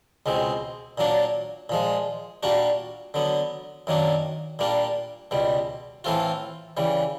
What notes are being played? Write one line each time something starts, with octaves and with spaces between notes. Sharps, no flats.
C#2 B2 G#3 C4
A#2 F#3 A#3 D4
A#2 F3 G#3
A#2 G3 A#3 D4 F#4
D3 F#3 B3
F#2 D#3 F#3 A#3 D4
A#2 G3 A#3 D4
C#2 B2 G3
A2 E3 A3 C4 F4
C#3 E3 G3